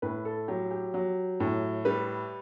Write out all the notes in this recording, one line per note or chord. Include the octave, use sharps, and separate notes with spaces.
A2 B4
A4
F#3 G4
G4
F#3
A2
G3 B4